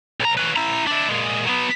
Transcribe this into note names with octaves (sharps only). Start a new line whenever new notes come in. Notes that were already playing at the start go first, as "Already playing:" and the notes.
B1 A#5
C#4 B4
E4 A#5
D4 E4
A#2 G#3
F#3 B3